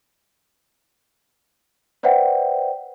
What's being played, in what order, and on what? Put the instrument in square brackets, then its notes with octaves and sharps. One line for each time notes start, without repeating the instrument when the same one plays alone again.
[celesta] B4 C5 D5 E5 F#5 G5